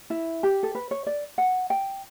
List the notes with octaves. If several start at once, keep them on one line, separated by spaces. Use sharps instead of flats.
E4
G4
A4
B4
C#5
D5
F#5
G5